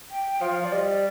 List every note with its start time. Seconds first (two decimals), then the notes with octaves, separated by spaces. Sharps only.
0.11 G5
0.41 F3 F5
0.62 F3 D5
0.72 G3 D#5
0.87 D#5
0.91 D5